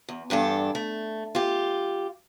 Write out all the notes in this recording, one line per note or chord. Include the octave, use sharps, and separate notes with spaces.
E2
E2 G2 D4 A4
A3
F4 G4